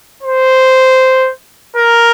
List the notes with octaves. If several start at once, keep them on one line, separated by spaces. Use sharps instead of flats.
C5
A#4